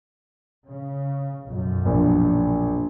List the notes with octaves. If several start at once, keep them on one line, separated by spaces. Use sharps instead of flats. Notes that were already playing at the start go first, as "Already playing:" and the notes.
C#3
B1 F#2
A#1